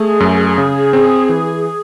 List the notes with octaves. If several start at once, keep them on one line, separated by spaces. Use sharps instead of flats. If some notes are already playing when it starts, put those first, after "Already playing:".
Already playing: A3 G#4
F#2
C#3
C4
E3